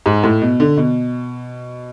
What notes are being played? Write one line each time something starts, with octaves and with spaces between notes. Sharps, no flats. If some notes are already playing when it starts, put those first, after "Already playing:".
G#2
A2
B2
D3
B2